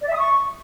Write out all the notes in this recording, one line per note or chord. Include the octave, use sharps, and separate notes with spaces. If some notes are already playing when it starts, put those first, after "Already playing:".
D5
E5
D#6
C#6